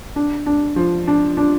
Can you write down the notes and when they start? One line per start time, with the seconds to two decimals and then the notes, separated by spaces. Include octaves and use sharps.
0.16 D4
0.46 D4
0.76 F3
1.07 D4
1.37 D4